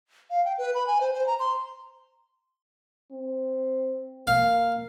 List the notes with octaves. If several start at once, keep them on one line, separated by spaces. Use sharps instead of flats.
F5
G5
B4
B5
G#5
C5
C5
A#5
C6
C4
A#3 F5